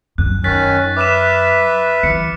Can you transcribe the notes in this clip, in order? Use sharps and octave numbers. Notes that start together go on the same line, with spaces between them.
F#2 F#6
D#3 C#4 F#6 A6 B6
B4 E5 D6 F6 E7
E3 C#7